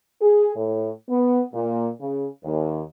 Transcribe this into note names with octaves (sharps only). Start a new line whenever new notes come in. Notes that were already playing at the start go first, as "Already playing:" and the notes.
G#4
A2
B3
A#2
C#3
D#2